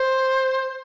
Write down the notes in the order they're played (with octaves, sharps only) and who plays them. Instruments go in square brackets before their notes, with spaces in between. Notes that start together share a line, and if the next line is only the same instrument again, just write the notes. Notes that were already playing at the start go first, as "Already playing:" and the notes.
Already playing: [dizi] C5